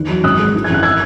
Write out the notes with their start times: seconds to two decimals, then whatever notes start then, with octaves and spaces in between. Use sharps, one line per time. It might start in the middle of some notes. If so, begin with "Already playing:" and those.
Already playing: E2 D#3 F#6
0.09 F#3
0.24 G#1 D#6 F#6
0.39 G#3
0.55 E3
0.64 G#6
0.70 G#1 F#6
0.83 E6 G#6